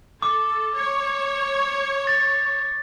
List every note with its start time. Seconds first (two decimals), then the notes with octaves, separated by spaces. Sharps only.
0.22 A4 D6
0.75 C#5
2.07 A6